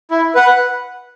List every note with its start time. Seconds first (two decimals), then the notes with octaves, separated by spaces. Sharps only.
0.11 E4
0.35 B4 F#5